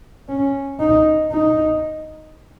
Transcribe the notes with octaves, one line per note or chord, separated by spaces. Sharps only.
C#4
D#4
D#4